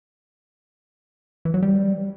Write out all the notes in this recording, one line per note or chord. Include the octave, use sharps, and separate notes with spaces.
E3
F#3
G3